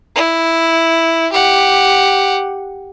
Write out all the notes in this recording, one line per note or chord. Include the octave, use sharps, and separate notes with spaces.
E4
G4 F#5